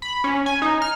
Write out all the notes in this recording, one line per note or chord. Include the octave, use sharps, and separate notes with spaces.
B5
C#4
G#5
D#4
F6